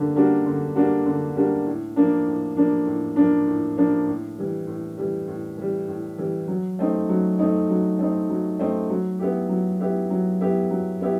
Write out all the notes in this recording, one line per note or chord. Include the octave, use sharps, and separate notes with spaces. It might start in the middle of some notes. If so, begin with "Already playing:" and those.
Already playing: D3 G3 A#3 D4
G3 A#3 D4 F#4
D3
G3 A#3 D4 F#4
D3
G3 A#3 D4 F#4
A2
F3 A#3 D4
A2
F3 A#3 D4
A2
F3 A#3 D4
A2
F3 A#3 D4
A2
E3 G3
A2
E3 G3
A2
E3 G3
A2
E3 G3
F#3
A3 C4 D#4
F#3
A3 C4 D#4
F#3
A3 C4 D#4
F#3
A3 C4 D#4
F#3
B3 E4 G4
F#3
B3 E4 G4
F#3
B3 E4 G4
F#3
B3 E4 G4